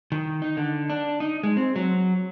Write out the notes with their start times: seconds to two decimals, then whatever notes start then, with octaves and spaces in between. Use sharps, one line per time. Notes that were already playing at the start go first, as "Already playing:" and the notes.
0.12 D#3
0.42 D#4
0.57 D3
0.90 D4
1.20 D#4
1.43 G#3
1.57 C4
1.76 F#3